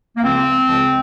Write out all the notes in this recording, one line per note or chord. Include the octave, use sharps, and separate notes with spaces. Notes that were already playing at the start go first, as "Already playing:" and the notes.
A#3
C#2 C#3 F3 C4
C#2 C#3 F3